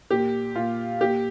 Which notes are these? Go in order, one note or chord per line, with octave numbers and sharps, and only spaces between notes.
A#2 G4
A#2 F4
A#2 G4